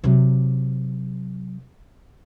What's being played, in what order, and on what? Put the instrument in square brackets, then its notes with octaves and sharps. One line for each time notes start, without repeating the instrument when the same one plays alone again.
[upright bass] C3 F#3